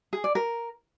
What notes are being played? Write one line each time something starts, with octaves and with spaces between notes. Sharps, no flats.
G#4
D5
A#4